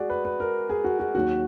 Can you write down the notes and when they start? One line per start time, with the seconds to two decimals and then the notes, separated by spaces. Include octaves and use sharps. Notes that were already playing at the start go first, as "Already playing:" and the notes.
Already playing: G#3 F#4 G#4 D5
0.10 B4
0.25 B4
0.40 A#4
0.70 G#4
0.84 F#4
0.99 F#4
1.15 D#2 D#3 F#3 F#4